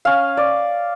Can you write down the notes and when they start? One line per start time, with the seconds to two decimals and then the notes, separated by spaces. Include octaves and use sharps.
0.05 C#4 F5
0.37 D5